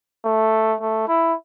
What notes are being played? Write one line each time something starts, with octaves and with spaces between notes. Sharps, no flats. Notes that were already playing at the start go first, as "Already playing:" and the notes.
A3
A3
E4